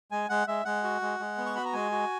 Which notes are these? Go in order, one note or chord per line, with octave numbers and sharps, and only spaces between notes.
G#3 G#5
G#3 F#5
G#3 E5
G#3 F#5
F#4
G#3
G#3
B3
C#6
F#4 B5
A#5
G#3 G#5
F#4